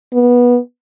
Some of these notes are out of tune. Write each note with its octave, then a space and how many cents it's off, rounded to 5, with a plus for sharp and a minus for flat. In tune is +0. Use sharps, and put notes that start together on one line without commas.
B3 -20